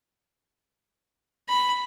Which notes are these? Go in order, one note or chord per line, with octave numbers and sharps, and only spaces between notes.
B5